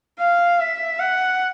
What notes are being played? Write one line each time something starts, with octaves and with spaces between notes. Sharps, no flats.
F5
E5
F#5